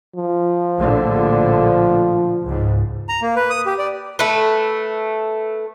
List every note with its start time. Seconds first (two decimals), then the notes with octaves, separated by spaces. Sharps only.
0.16 F3
0.79 A#1 A2 D3
2.45 C#2 G#2
3.09 A#5
3.22 A#3
3.36 B4
3.50 D#6
3.66 G4
3.79 D5
4.19 A3 B4